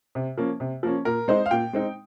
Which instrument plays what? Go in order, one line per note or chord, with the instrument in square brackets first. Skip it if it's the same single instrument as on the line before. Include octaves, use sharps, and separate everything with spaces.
[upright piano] C3
F3 A#3 C#4
C3
F3 A#3 C#4
A#2 A#4
G#3 C4 D#4 C5
F5
A#2 G5
G#3 C4 D#4